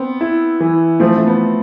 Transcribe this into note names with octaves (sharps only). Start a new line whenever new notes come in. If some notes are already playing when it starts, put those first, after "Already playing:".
Already playing: B3 C4
E4
E3
F3 A3 C4
A3
B3